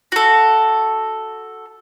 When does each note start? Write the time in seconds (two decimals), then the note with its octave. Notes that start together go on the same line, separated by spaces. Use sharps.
0.12 F#4 A4